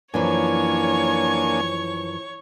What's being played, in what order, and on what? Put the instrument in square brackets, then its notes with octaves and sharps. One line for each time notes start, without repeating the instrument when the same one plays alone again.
[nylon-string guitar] F#2 E3 F3 [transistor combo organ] A#3 D4 G#5 [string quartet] C#5 C#6